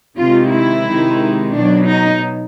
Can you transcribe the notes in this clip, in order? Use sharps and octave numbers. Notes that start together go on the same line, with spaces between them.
C3 D#3 G#3 F4
E4
C3 D#3 G#3
B2 F#3 D4
D#4